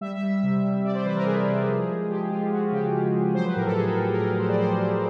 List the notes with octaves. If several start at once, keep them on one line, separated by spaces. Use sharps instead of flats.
G3 E5
E5
G3
E5
C3
G3
G3 D5
C5
E3 B4
A#4
C3 G#4
C3
F3
G#3
F3 G4
G#3 F4
G#3 F#4
C#3 G4
C#3
F3
F#3 C5
B4
A2 A#4
A4
A2 G#4
A2 A#4
A#4
A2 A4
F#3 C5
D5
F#3 C5
F#3